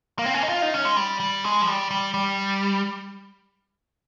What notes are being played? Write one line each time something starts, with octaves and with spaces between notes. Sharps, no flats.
A#3
C4
C#4
D#4
F4
D#4
C#4
G#3
G3
G3
G#3
F3
G3
G3
G3